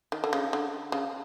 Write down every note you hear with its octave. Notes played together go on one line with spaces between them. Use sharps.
D#3
D3
C#3
D3
C#3